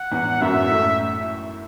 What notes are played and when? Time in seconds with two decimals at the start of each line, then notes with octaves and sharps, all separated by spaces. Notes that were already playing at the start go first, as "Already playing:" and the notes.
Already playing: F#5
0.12 E2 E3
0.41 F#2 F#3 E5
0.71 A2 A3